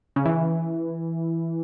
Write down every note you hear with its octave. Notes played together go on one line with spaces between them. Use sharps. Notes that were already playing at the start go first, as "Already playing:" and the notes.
C#3
E3